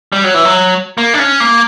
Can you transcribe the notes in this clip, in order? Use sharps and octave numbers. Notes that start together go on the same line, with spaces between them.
G3
F#3
E3
F#3
A#3
D4
C#4
A#3